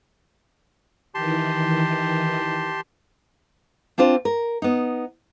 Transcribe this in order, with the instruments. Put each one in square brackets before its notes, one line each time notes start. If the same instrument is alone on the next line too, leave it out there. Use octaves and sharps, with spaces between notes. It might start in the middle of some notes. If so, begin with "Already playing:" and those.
[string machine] D#3 E3 [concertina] G4 A5 C6
[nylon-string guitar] C4 D4 F4 C5
A#4
B3 D#4